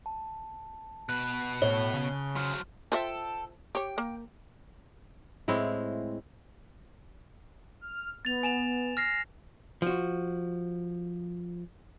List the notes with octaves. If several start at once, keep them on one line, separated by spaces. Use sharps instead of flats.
A5
B2 B4 F#6
A2 C#5 G7
C#3
F#3 C5 C6 F6
F4 A4 C5 E5 G5
G4 C#5 G5
A#3
A2 G#3 C4 E4
F6
B3 A6 F7
G#5 E7 F7
F6 A#6 C7
F3 F#4